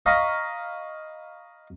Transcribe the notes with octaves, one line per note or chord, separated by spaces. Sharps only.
D#5 F5 A#5 B5 C#6